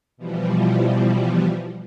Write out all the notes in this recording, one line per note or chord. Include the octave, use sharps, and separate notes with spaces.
B2 E3 F3 G3